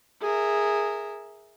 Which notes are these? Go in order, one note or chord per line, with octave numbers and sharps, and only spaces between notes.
G#4 A#4 E5